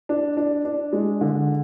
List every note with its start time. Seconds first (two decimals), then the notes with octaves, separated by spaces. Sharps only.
0.09 D4
0.37 D4
0.65 D4
0.93 G#3
1.21 D3